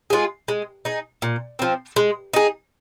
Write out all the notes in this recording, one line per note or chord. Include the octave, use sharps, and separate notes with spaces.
G#3 F4 G#4
G#3
D#4 G#4
A#2
F3 C4
G#3
D#4 G#4